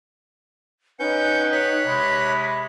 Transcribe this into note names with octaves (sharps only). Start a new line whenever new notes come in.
C#4 D#4 B4 F#5 G5 G6 C#7
C#5 F#6 B6
C3 G#3 B5